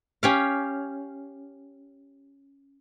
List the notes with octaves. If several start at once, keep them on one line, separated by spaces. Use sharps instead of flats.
C#4 G4 F5